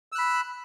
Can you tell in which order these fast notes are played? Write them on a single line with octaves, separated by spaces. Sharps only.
E6 F#6 B5